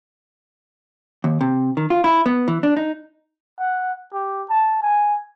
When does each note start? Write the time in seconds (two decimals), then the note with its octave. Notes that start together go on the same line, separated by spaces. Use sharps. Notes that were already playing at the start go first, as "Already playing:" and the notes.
1.24 D#2
1.41 C3
1.77 D#3
1.90 F4
2.04 E4
2.26 B3
2.48 E3
2.63 D4
2.77 D#4
3.59 F#5
4.13 G4
4.50 A5
4.82 G#5